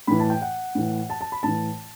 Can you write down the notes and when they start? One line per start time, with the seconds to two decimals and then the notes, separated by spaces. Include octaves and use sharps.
0.07 A2 E3 B5
0.20 A5
0.30 G5
0.42 F#5
0.75 A2 E3
1.10 A5
1.21 A5
1.32 B5
1.43 A2 E3 A5